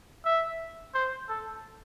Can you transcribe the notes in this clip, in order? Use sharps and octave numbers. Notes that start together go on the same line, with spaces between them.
E5
C5
A4